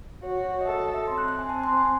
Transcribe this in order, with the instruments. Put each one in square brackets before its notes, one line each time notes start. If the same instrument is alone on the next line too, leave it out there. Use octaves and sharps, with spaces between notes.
[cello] F#4 [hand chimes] C#5
[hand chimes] C#5
D#5
[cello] A4 [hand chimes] E5
[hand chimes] D#5
E5
[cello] C4 [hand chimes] C6
[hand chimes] F#6
F#6
G#5
A5
C6
G#5